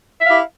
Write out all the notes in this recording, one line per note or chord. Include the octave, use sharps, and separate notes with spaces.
E4 G4 E5 F5